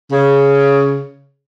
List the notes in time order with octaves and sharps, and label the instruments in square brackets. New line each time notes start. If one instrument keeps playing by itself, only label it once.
[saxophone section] C#3